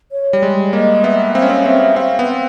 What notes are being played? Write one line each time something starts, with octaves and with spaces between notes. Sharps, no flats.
C#5
G3
G#3 D5
A#3 D#5
B3 E5
C4 F5
C#4
C4
C4 E5
C4 F5
B3